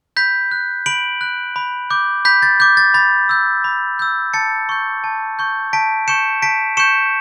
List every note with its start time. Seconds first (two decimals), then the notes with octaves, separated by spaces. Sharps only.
0.17 B5 G6 B6
0.51 F#6
0.86 B5 D7 F#7
1.21 F#6
1.56 B5
1.90 D6 G6
2.25 B5 G6 B6
2.42 A6
2.60 D6 G6
2.77 A6
2.94 B5 A6
3.29 E6 G6
3.64 B5
3.99 E6 G6
4.34 A5 A6 C#7
4.69 C#6 G6
5.04 A5
5.39 C#6 G6
5.73 A5 B6 D7
6.08 C#6 G6 C#7 E7
6.42 A5 B6 D7
6.77 C#6 G6 C#7 E7